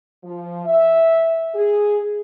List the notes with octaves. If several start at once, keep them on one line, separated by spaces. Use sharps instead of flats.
F3
E5
G#4